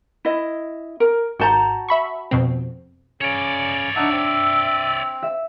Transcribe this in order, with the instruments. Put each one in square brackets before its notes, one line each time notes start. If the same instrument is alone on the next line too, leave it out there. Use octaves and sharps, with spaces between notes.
[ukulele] E4 D#5
A#4
[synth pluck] G#1 G6 [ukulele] F#4 A5 A#5
[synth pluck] E5 B5 C#6
F2 B2 C4
[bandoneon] C#3 C#4 [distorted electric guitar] C#5 D5
[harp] D4 D#7 [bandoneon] D#4 F#5 A5 [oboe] E5
[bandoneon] C4
[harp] E5